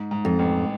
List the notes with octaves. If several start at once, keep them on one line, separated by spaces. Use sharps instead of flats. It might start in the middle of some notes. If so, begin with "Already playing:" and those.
Already playing: G#2
G#2
F2
A1